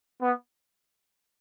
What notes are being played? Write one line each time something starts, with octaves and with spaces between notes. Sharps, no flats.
B3